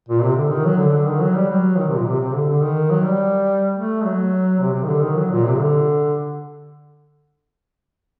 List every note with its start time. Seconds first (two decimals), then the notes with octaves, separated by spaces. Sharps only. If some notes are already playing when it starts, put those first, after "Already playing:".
0.08 A#2
0.22 C3
0.36 D3
0.50 D#3
0.65 F#3
0.78 D3
0.93 D3
1.07 D#3
1.21 F#3
1.35 G3
1.49 F#3
1.77 D#3
1.87 C3
1.96 A#2
2.06 C3
2.19 C3
2.34 D3
2.49 D3
2.62 D#3
2.90 F#3
3.05 G3
3.75 A3
4.04 F#3
4.59 C3
4.74 C3
4.83 D#3
4.88 D3
5.03 D#3
5.16 F#3
5.31 A#2
5.45 C3
5.59 D3